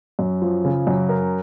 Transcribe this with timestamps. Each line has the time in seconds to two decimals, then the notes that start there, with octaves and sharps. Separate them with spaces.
0.19 F#2
0.42 F3
0.65 C#3
0.87 F#2
1.09 A#4